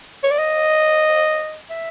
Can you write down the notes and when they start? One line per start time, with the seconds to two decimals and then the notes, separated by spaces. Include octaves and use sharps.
0.23 C#5
0.31 D5
0.38 D#5
1.71 E5